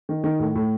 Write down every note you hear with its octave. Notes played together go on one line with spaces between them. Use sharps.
D#3
D#3
A2
A2